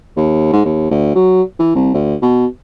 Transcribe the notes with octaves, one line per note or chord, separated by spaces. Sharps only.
D#2
G#2
D#2
D2
F#3
E3
C2
D2
B2